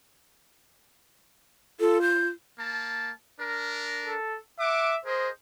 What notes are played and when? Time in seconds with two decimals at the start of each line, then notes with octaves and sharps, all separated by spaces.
1.80 F4 A4
2.02 G6
2.58 A#3 A5
3.40 D4 A#4
4.06 A4
4.59 E5 F#5 D6
5.05 G#4 A#4 C5 D#5